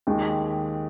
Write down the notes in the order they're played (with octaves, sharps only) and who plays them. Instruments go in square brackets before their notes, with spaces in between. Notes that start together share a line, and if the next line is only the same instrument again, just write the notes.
[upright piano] D#2 D#3 G#3